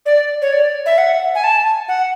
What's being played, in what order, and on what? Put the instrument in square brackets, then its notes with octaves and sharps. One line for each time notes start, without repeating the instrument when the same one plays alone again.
[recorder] D5
C#5
D5
E5
F#5
G#5
A5
F#5